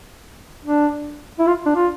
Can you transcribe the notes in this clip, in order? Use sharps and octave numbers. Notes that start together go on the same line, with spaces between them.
D4
E4
F4
D4
F4